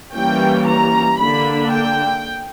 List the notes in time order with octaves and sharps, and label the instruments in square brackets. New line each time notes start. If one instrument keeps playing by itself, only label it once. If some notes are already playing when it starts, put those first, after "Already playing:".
[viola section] E3 G3 A#3 C#4 G5
A#5
D3 A#3 D4 B5
G5